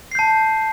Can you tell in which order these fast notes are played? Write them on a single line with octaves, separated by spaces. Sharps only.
C7 G6 A5